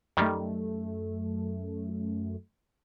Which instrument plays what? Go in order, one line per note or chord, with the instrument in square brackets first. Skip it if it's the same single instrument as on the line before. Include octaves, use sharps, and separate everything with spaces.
[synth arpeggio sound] F#2 A3 [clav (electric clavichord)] D#3 G3